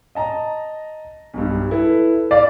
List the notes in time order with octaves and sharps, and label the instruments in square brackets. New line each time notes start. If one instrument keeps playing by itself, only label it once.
[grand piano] D#5 A5 A#5
B1 G2
E4 A4 B4
[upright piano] D5 [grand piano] F5